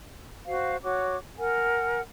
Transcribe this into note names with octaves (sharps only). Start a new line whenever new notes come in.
F#4 C5 F5
F#4 C#5 D6
A#4 F#5 G#5